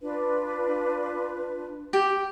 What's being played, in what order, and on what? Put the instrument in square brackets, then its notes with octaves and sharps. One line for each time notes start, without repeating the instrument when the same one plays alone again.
[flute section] D4 F4 B4
[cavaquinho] G4